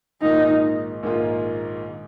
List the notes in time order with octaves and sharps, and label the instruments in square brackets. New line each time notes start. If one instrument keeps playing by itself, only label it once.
[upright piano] A#1 G#2 D#3 A#3 F4 [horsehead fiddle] D#4
[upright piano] A#1 G#2 D#3 A#3 F4